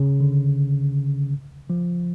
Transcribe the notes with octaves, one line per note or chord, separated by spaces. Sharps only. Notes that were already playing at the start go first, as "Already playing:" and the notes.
Already playing: C#3
D3
F3